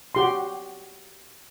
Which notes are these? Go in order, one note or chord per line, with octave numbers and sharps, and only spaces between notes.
F#4 G4 C6